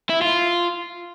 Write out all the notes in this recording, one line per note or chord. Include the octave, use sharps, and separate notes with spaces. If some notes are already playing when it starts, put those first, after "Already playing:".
E4
F4